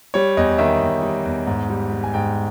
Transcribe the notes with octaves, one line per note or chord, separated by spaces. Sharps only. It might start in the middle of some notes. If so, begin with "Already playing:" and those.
G3 C#5
E2 D#5
D#3 E5
E2
G3
E2
G#2
G3
G3
G#5
G#2 G5